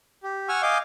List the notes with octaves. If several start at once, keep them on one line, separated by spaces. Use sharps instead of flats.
G4
F#5 G#5 C#6 E6 F6
D#5 F5 G#5 D6 G6